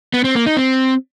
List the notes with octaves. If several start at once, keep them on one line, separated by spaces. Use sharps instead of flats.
B3
C4
A#3
D#4
C4